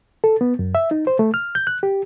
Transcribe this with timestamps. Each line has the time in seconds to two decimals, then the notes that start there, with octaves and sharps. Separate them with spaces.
0.24 A4
0.41 B3
0.59 F#2
0.75 E5
0.91 D#4
1.07 C5
1.19 A3
1.34 F6
1.55 G6
1.67 F#6
1.83 G4